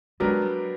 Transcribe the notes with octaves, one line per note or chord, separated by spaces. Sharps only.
F#3 G#3 B3 D4 G4 A#4
G3